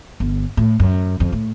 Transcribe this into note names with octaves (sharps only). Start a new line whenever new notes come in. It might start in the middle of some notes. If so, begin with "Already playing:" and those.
G1
A2
F#2
F2
A2